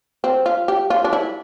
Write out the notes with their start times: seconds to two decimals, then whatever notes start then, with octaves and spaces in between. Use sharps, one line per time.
0.24 C4
0.46 F4
0.68 G4
0.90 F4
1.04 D4
1.13 E4